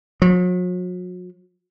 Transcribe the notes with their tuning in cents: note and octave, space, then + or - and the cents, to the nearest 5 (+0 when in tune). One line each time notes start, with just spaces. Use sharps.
F#3 -40